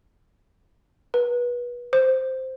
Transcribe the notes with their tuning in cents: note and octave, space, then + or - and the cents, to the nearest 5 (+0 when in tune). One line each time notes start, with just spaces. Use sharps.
B4 -30
C5 -5